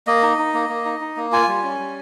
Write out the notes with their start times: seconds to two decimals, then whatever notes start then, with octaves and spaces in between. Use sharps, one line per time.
0.07 A#3 D#5
0.23 D#4
0.39 D#4
0.54 A#3
0.69 A#3
0.85 D#4
1.01 D#4
1.17 A#3
1.32 F4 G#5
1.48 G3
1.63 C#4
1.79 G3